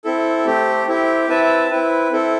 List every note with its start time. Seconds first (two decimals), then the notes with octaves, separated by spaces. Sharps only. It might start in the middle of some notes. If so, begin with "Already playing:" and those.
0.05 C4 E4 A4
0.46 A3 C4 G4
0.87 C4 E4 G4
1.29 C4 E4 B4 E5 A5
1.71 C4 E4 B4
2.12 C4 E4 A4